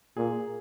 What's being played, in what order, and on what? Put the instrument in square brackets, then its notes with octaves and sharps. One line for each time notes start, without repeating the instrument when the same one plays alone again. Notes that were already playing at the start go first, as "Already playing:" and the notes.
[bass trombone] A#2 [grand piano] G#4